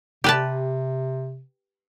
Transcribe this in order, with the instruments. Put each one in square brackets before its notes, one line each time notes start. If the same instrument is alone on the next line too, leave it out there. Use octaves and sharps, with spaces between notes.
[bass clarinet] C3 [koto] G4 B4 A5